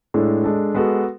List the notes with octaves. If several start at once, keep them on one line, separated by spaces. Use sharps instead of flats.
A2 G#3 D4 A4
G#3 D4 A4
G#3 B3 F#4 A4